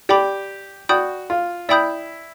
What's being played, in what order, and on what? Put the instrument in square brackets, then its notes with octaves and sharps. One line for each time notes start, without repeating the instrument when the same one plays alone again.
[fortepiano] G4 [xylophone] D5 G5 B5 D6
[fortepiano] F#4 [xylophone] D5 G5 B5 D#6 G6
[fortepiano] F4
[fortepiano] E4 [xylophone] D5 G5 B5 D#6 G6